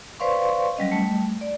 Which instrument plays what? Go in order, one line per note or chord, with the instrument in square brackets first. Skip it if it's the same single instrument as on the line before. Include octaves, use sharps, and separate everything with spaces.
[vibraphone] B4 C5 D5 F5 C6 C#6
F#3 G3 C#4 D#5
G3 A3
D5